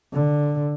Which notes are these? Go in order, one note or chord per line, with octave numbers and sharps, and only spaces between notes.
D3